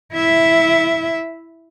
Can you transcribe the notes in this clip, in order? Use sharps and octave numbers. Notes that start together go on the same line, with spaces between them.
E4 E5